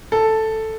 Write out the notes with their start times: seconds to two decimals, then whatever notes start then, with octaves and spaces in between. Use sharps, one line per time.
0.12 A4